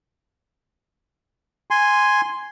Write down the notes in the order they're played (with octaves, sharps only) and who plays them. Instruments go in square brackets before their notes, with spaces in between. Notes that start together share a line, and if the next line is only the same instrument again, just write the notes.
[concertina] G#5 C6